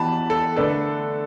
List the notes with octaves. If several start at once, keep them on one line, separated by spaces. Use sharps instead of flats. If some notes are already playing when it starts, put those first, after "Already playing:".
Already playing: E3 B3 G4 A5 B5
A4
D3 A3 D4 A4 B4